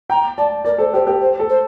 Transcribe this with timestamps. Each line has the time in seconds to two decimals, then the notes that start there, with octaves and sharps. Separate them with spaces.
0.10 G5 A#5
0.37 D5 A5
0.65 A#4 D5
0.78 A4 C5
0.93 G4 C5
1.06 G4 A#4
1.20 C5
1.39 A4
1.49 C5